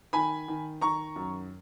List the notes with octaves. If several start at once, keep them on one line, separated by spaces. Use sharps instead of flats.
D#3 G#5 B5
D#3
D#3 A#5 C#6
F#2